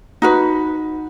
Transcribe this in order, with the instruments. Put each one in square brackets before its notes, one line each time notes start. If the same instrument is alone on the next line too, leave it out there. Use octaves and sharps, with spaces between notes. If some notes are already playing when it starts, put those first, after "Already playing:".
[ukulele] D#4 F#4 B4